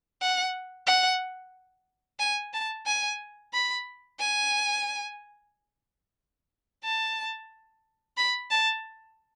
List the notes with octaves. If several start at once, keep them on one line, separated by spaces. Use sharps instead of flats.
F#5
F#5
G#5
A5
G#5
B5
G#5
A5
B5
A5